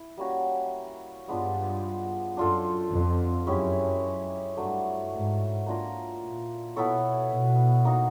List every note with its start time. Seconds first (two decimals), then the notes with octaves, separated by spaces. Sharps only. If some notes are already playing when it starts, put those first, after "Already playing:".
Already playing: E4
0.17 G3 A#3 C#4 F#4
1.28 G2 G#3 B3 D4 F4
2.37 F#2 D4 F4 A4 C5
2.92 F2
3.47 F#2 G#3 C#4 E4 G4
4.57 G2 F#3 A3 D4
5.12 G#2
5.66 A#3 D4 F4 A#4
6.21 A#2
6.76 B2 B3 E4 A4 C#5
7.31 B2
7.85 A#3 D#4 F#4